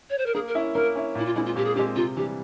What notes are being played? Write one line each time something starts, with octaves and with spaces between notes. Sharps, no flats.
C#5
C5
A#4
A#3 G#4
A#4
C#4 E4
A#3 A#4
C#4 E4
A#2 E4
F4
G#3 C4 E4
F4
A#2 G4
G#4
G#3 C4 G4
C3 F4
E3 G3 G4